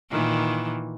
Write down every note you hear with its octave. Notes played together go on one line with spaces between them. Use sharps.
A#2 D#3 E3